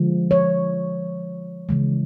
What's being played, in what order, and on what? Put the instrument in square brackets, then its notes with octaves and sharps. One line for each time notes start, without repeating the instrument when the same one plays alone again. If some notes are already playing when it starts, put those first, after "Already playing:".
Already playing: [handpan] D3 F3 G#3
C#5
C#3 E3 G#3